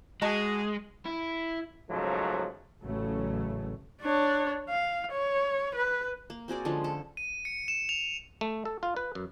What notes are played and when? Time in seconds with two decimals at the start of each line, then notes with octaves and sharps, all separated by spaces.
0.22 G#3 F#4 G#4 D#5 A5
1.05 E4
1.90 D#2 G#2 C#3 F3 F#3 A3
2.83 A1 C#3 F#3 A3
4.01 D4 C#5
4.70 F5
5.12 C#5
5.75 B4
6.30 A#3
6.48 C4 F#4 G#4 D5
6.65 D3 F3 G#3 C#4
6.84 A4
7.17 D#7
7.45 C#7
7.68 E7
7.89 F7
8.41 A3
8.65 A4
8.83 F4
8.97 B4
9.15 F#2